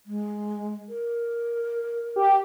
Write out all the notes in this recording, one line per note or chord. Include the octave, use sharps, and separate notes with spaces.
G#3
A#4
G4